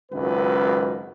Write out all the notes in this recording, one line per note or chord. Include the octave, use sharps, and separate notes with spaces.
G#1 C#2 F#2 B4